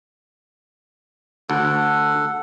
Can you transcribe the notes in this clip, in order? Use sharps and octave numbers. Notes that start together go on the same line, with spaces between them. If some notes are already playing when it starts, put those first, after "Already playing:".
D2 A4 F#5